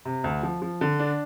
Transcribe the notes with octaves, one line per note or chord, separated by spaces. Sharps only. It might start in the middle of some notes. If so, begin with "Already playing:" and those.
C3
D2
F3
F3
D3
D4